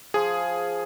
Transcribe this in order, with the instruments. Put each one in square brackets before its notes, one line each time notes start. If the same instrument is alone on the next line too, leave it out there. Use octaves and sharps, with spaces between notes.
[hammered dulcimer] F3 [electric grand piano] G#4